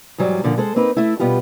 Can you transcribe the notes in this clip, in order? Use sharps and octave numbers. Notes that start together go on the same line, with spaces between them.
G#2 E3 F#3 G3
A#2 D3 F3
G#3 A4 C5
A#3 C4 D#4 B4
A3 E4
B2 G3 B3 F4 G4